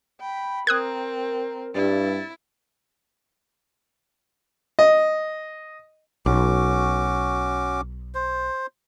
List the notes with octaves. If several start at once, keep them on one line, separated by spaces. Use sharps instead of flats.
G5 B5
C4 A#4 D#6 F#6 G#6
G2 E4 A6
D#5
B1 C#4 F#4 D6
C5